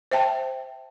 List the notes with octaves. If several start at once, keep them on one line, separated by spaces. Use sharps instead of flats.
C5 E5 G5 A5